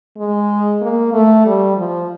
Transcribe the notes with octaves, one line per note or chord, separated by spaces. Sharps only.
G#3
A#3
A3
G3
F3